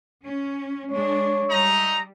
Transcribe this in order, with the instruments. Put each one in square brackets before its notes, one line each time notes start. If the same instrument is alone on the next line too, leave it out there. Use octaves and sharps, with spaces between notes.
[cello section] C#4
[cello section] G#3 D4 [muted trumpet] C#5
[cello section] G3 [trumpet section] A3 D#4 A#5